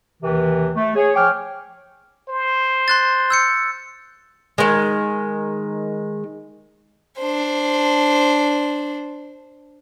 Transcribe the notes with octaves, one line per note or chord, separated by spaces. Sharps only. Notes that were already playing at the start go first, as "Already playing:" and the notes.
D#2 C3 D#3 E3
A3
G#4 C#5
F3 C#5 G5 G#5 D6 F6
C5
C6 F#6 A6
E6 G6 C#7
D#3 G#3
D4 C5